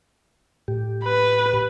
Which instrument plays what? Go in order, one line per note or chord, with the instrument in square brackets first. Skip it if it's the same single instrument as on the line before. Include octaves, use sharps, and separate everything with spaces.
[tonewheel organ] A2 G4
[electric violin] B4